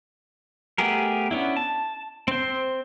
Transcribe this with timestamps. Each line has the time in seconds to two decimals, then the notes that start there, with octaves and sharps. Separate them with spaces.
0.78 A3 B3 G4 G#4 A#4
1.31 B3 C#4 D4 E4
1.57 A5
2.28 C4 C5